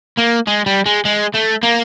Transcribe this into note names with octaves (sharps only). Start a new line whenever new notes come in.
A#3
G#3
G3
G#3
G#3
A3
A#3